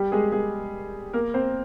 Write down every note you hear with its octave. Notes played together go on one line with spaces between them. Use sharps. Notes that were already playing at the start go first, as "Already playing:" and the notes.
Already playing: G3 G4
G#3 G#4
G#3 G#4
A#3 A#4
C4 C5